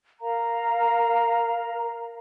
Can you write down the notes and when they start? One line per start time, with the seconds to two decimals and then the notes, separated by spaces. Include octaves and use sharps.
0.20 A#4 F5 A#5